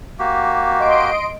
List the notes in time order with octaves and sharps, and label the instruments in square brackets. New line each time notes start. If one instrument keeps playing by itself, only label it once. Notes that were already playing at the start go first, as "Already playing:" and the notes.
[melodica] A#3 F#4 G4
[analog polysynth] D#5 C6 D7